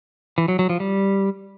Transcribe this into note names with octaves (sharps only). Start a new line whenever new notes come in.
E3
F#3
F#3
F3
G3